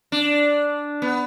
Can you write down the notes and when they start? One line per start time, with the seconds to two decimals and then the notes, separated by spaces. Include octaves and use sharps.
0.12 D4
1.02 B3